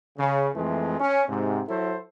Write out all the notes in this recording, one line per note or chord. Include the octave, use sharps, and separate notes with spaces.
C#3
F2 E3 G#3 A3
C#4
G#2 C3
F#3 E4 A4 C5